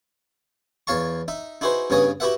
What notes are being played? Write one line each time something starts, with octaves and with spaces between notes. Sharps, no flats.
E2 C#5 F5 A5 C#6
D#4 E5
D#4 E4 F#4 G#4 B4 C5
G2 C#3 B3 C#5 G#5 D#6
E4 F#4 G4 B4 E5 F#5